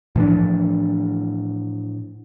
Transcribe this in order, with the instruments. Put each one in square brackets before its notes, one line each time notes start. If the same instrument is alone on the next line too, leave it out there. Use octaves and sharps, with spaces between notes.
[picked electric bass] A2 E3 F3 D4